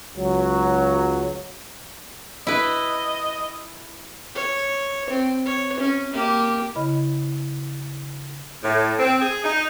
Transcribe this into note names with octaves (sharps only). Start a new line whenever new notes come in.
C#2 F#3
E4 B4 D#5
C#5
C4
C#5
C#4
A#3 G4
C#3 E4 D#5 B5
A2
C4
G#4
D#4